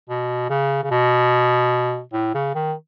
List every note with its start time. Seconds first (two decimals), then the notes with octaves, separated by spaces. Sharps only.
0.09 B2
0.50 C#3
0.83 C#3
0.91 B2
2.13 A2
2.35 C#3
2.55 D#3